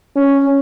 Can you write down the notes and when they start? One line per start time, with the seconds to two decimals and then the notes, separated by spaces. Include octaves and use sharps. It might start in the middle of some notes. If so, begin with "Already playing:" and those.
0.16 C#4